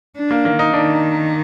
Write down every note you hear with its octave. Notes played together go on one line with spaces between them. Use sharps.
D4
A#3
D#3 A#3
D#4
D#3 D4